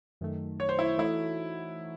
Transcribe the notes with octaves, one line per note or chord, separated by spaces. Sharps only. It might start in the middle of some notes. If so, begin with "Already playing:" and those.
F#2 D#3 A3
C#5
C5
E4
E3 A3 D#4 E4 F#4